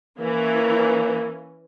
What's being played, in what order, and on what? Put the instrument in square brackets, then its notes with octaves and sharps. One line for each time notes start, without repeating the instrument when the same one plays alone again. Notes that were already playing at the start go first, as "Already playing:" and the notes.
[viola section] E3 C#4 [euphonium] A#3